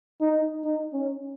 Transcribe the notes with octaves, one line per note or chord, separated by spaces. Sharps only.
D#4
D#4
C#4